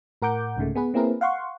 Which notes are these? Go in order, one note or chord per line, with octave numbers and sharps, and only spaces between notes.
A2 A#4 F#5 D6 G6
C2 G#2 C#3 G#3 A3
B3 G#4 B4
A#3 C4 E4 G#4 A#4 B4
F5 F#5 C6 C#6